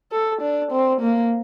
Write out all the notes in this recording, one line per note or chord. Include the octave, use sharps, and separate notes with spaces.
A4
D4
C4
A#3